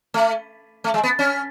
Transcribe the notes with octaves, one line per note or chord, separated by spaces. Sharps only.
A3
A3
G#3
B3
C#4